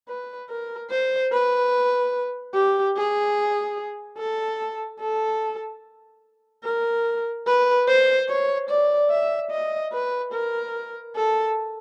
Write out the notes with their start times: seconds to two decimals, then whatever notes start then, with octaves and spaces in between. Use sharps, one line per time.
0.08 B4
0.50 A#4
0.91 C5
1.32 B4
2.54 G4
2.96 G#4
4.18 A4
5.00 A4
6.64 A#4
7.47 B4
7.88 C5
8.29 C#5
8.70 D5
9.11 E5
9.51 D#5
9.92 B4
10.33 A#4
11.16 A4